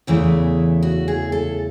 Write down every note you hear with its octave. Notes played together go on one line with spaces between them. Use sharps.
E2 C#3 E3 A3 E4
F#4
G#4
A4